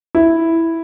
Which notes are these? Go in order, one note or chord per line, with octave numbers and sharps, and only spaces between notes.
E4